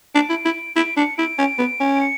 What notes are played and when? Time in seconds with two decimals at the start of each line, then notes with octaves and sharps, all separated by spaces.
0.14 D4 D7
0.29 E4
0.45 E4
0.76 E4 D7
0.97 D4 C#7
1.17 E4 D7
1.38 C#4
1.58 B3
1.80 C#4
1.95 D7
2.01 C#7